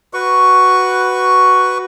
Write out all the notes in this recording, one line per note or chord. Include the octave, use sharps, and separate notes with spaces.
F#4 B4 C#6